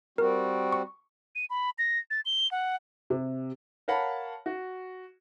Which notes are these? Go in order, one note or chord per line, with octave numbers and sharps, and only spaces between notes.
G3 C4 F#4 A#4
C#6
D#7
B5
A#6
A6
G7
F#5
C3
A#4 C#5 F5 F#5 A5 B5
F#4